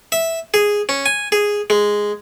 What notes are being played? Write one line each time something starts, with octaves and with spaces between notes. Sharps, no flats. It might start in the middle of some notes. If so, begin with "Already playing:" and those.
E5
G#4
C#4
G#5
G#4
G#3